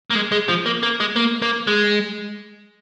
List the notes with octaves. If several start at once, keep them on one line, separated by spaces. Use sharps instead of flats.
A#3
G#3
G#3
F3
A#3
A#3
G#3
A#3
A#3
G#3